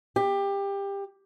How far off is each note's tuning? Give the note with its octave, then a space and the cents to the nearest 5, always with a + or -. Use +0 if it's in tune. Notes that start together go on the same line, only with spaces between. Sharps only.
G4 +20